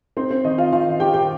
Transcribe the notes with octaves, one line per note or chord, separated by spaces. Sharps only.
C4 D#4 C5
C4 C5
D#3 D#4 D#5
F4 F5
D#3 F4 F5
D#3 G4 G5
G4 G5